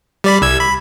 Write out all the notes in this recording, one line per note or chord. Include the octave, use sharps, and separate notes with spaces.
G3 D5 B5
C2 E6 G#6
B5